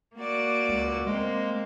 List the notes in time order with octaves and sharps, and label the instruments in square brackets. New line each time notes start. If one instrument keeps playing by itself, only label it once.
[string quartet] A#3 F#4 D5
[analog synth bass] C#2
[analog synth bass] G#3 [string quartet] A#3 C4